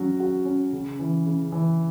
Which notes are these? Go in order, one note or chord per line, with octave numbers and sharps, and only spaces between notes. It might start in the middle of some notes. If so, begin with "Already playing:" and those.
Already playing: F#3 C#4 F#4
F#4
C#4
C#3
E3
C#3
E3